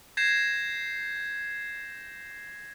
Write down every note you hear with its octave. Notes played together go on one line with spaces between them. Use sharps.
G6 G#6 A#6 C7 E7